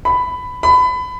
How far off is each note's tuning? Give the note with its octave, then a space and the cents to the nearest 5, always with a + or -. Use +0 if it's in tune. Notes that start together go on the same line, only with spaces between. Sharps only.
B5 +10
B5 +25